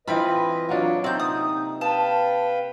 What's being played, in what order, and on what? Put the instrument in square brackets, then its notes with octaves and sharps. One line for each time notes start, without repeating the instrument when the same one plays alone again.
[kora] E3 C4 F4 [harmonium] B4 D#5 [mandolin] B5
[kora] F#3 A#3 D4 [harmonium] F4 C#5
[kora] C3 [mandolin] C4 G6 [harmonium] D#4
[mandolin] D#6
[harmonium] B4 F5 G5 [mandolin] A5